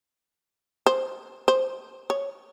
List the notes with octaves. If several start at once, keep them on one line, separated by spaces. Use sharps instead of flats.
C5
C5
C#5